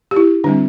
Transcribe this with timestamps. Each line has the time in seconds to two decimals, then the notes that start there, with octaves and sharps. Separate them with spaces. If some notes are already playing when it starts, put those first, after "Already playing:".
0.11 G4
0.16 E4
0.44 D3 G3 C4 D4